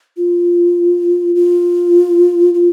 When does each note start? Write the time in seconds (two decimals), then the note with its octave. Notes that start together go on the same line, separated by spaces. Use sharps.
0.17 F4
1.35 F4
2.54 F4